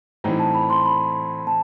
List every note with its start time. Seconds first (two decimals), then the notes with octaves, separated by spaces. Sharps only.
0.24 A2 E3 G3 C4 D#4 A#5
0.39 A5
0.55 B5
0.70 C6
0.85 B5
1.47 A5